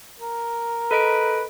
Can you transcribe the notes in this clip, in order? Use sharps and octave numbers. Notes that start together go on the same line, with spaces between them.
A#4
A4 B4 D#5 D7